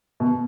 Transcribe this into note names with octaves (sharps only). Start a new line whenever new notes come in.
B2